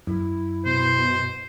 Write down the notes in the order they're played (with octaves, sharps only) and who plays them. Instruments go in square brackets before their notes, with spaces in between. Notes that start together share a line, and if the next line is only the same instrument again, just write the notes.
[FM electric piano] F#2 [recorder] E4
[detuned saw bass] B2 [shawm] C5